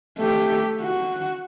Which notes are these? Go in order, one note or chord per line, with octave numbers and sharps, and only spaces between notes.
A3 G4
F#4